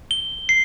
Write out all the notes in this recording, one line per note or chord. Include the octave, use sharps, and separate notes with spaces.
G7
C7